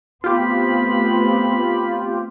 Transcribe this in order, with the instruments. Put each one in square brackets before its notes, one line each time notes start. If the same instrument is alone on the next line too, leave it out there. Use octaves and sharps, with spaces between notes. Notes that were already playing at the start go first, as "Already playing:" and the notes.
[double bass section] A3 B3 C4 [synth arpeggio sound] F4 G4 [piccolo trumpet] B5